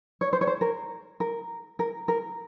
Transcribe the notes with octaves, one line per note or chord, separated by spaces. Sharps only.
C#5
C5
C#5
C5
A#4
A#4
A#4
A#4